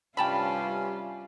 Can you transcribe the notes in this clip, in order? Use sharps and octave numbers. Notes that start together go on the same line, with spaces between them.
G2 C3 G3 C#4 F4 G5 A5 B5